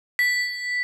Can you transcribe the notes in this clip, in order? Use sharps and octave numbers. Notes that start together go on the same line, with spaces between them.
B6